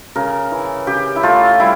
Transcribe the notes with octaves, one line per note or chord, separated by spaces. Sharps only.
C#3 A#4
E3
C#3 G4
E4
A3 F4
G3 E4